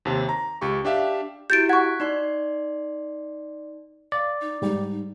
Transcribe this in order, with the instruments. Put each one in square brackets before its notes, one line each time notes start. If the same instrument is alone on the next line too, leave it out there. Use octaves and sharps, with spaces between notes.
[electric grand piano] D#2 C3
A#5
C#2 G4 C#6
D4 G4 E5 F5
[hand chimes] E4 F#4 G4 [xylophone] G6 A6 D7
[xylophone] F#5 C#6 [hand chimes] F#6 G#6 B6
[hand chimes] D#4 D5 C6
[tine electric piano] D5 [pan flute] F5
[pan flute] D#4
[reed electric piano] G#2 G3 [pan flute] D#4